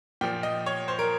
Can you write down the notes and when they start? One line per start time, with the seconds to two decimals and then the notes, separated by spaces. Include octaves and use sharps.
0.21 A#2 F3 G5
0.43 D#5
0.66 C#5
0.88 C5
0.99 A#4